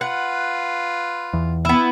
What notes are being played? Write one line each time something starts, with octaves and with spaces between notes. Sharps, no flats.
F4 B4 F#5
E2
B3 E4